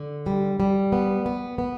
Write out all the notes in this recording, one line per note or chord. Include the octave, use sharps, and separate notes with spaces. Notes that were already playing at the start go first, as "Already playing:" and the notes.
Already playing: D3
G3
G3
B3
B3
B3